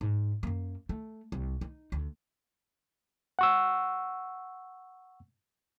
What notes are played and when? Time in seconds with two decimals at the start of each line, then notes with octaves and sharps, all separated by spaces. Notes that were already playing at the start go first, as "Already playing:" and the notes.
0.01 G#2
0.43 F#2 A#3
0.89 A3
1.32 C2
1.61 D#4
1.92 D2
3.39 F#5 C#6 E6